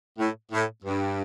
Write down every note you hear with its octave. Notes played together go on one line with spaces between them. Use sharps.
A2
A2
G2